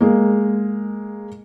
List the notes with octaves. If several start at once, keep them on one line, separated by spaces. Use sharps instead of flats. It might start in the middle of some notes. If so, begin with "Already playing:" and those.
G#3 A#3